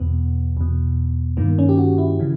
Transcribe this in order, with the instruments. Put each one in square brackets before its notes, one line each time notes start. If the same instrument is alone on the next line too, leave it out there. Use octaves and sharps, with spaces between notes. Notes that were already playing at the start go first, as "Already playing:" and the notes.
Already playing: [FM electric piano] E2 B2 B3
E2 B2
G2 D#3 A#3
C#4
G4
F#4
E4
C#3 E3